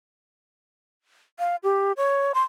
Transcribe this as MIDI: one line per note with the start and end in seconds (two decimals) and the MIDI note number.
1.39 1.56 77
1.63 1.92 67
1.97 2.32 73
2.35 2.43 84